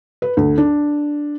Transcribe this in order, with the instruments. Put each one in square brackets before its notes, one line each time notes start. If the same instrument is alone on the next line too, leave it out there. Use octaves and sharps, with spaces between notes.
[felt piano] B4
D2
D4